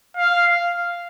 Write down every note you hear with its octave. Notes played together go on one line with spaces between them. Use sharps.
F5